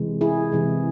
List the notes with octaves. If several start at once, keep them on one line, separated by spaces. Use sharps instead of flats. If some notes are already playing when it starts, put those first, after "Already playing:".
Already playing: C3 E3 G#3
E4 G#4
C3 E3 G#3